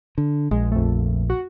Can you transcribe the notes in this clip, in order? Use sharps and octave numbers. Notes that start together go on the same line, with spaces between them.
D3
A#1 G#3
F2 A3
F#4